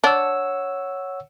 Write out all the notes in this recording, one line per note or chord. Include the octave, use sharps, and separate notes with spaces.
D4 C#5 F#5 E6